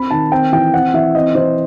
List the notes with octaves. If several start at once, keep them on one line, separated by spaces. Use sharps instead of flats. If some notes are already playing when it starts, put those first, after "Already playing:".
Already playing: C4 B5
D#3 A5
C4 G5
E3 G5
C4 F#5
E3 E5
C4 D#5
E3 C5